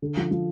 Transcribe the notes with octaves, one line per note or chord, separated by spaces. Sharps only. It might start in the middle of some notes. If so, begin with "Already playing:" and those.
D3
F3
F3